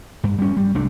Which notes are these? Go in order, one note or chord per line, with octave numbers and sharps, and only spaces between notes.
G2
G3 C#4
G3
C2 A3 D4